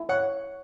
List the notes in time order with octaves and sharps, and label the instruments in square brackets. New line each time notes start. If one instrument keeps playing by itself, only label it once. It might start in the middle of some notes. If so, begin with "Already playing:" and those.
Already playing: [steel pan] E4
[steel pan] C#5 [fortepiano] F#5